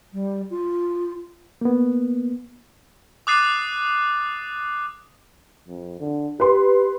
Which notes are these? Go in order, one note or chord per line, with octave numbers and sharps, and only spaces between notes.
G3
F4
A#3 B3
D6 D#6 F#6 A6 C7 D#7
F2
D3
G4 B4 C6